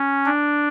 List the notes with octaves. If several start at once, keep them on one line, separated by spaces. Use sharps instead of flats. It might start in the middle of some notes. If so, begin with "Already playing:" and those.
Already playing: C#4
D4